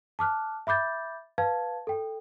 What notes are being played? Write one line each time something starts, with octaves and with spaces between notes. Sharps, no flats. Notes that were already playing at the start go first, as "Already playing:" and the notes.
A5 D6 F6 F#6
E5 B5 D6 G6 A6
B4 F5 A5 G#6
A4 G5